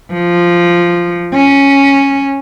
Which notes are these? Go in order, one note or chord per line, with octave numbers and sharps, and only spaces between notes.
F3
C#4